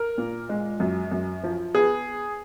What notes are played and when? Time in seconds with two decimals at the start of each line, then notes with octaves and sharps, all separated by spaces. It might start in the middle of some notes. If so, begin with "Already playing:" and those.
Already playing: A#4
0.18 A#2
0.49 G#3
0.80 F#2
1.12 F#2
1.43 F3
1.74 B3 G#4